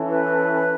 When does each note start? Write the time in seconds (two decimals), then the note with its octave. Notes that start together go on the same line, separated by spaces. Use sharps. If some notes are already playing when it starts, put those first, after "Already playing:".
Already playing: E3 C#4 E4 A4
0.10 B4